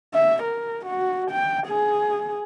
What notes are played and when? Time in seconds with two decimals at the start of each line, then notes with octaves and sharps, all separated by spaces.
0.14 E5
0.44 A#4
0.86 F#4
1.31 G5
1.68 G#4